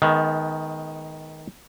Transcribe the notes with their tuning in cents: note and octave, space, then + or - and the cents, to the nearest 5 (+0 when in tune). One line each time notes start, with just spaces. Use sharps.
D#3 +10 G#3 +40 B3 +10